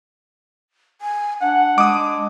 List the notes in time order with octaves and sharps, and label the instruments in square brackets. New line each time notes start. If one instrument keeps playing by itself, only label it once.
[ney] G#5
[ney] D4 [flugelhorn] F#5
[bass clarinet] G#3 [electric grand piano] D6 D#6